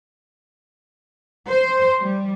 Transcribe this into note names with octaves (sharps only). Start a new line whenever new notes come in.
C5
G3